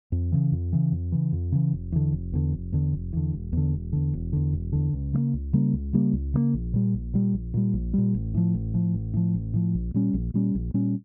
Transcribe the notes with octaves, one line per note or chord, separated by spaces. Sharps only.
F2
C#3 E3
F2
C#3 E3
F2
C#3 E3
F2
C#3 E3
F1
E2 D3
F1
E2 D3
F1
E2 D3
F1
E2 D3
E1
E2 D3
E1
E2 D3
E1
E2 D3
E1
E2 D3
C#2
C#3 G3 A#3
C#2
C#3 G3 A#3
C#2
C#3 G3 A#3
C#2
C#3 G3 A#3
A#1
A#2 G3
A#1
A#2 G3
A#1
A#2 G3
A#1
A#2 G3
A1
A2 F3
A1
A2 F3
A1
A2 F3
A1
A2 F3
A#1
A#2 G3 C#4
A#1
A#2 G3 C#4
A#1
A#2 G3 C#4